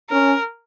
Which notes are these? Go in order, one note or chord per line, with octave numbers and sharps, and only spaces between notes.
C#4 A#4